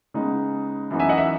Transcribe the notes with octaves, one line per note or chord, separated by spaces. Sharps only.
C#3 G#3 B3 D#4
F#2 E3 B3 D#4
E5 G#5
D#5 F#5
E5